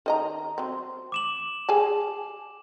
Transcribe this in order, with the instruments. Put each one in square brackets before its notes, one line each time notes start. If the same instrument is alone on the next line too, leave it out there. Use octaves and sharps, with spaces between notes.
[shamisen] D#3 D#5 A#5
F#3 C4
[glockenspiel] D6 E7 F#7
[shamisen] G#4 G#5 A5